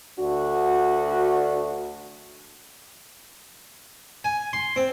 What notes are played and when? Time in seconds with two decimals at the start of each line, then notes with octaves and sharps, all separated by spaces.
0.19 D2 D4 F#4
4.24 G#5
4.53 C6
4.76 C4